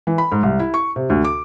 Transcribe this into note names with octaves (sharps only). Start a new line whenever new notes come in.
E3
B5
G#2
C2
E4
C#6
C3
D2
D6